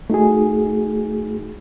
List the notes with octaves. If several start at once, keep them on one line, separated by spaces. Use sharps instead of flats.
A3 D#4 F#4 G#4